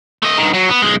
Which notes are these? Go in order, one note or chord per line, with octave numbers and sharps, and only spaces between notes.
A3 D#5
G2 D#3
F#3
B3
B1 G#3